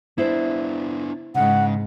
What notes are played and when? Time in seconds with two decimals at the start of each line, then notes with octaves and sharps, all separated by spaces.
0.18 B3 D4 E4 C5
1.35 G#2 C#3 F#5